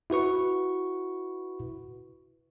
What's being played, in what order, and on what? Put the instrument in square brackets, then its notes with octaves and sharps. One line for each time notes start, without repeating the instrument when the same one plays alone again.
[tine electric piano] E4 F#4 B4 C#6